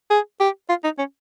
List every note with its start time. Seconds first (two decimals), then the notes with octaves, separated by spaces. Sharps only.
0.10 G#4
0.40 G4
0.69 F4
0.84 D#4
0.99 C#4